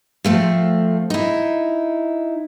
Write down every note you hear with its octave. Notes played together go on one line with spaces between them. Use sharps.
F3 A3 C4
D#4 E4